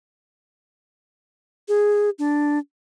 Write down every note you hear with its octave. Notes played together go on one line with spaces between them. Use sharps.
G#4
D4